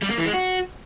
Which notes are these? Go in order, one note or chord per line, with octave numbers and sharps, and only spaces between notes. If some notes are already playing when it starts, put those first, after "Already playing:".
G3
A#3
E3
G#3
F#4